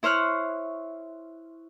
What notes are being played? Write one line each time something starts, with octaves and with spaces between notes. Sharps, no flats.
E4 C5 C#5 F6 F#6